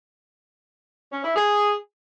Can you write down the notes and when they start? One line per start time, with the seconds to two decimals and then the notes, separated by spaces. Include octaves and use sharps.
1.12 C#4
1.23 E4
1.35 G#4